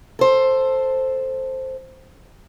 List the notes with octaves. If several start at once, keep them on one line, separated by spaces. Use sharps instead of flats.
A4 C5